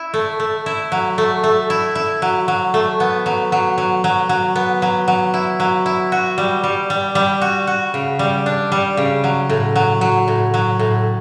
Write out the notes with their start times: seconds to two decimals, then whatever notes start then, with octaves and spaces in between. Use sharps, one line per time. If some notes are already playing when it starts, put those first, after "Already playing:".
Already playing: E4
0.14 A3
0.40 A3
0.66 E4
0.92 F#3
1.18 A3
1.44 A3
1.70 E4
1.95 E4
2.22 F#3
2.48 F#3
2.74 A3
3.00 B3
3.26 F#3
3.52 F#3
3.78 F#3
4.04 F#3
4.29 F#3
4.56 B3
4.82 F#3
5.08 F#3
5.34 E4
5.60 F#3
5.86 E4
6.12 F#4
6.38 G3
6.64 G3
6.90 G3
7.15 G3
7.41 F#4
7.67 F#4
7.94 C#3
8.19 G3
8.46 D4
8.72 G3
8.97 C#3
9.24 F#3
9.50 A2
9.76 F#3
10.01 F#3
10.28 A2
10.54 F#3
10.79 A2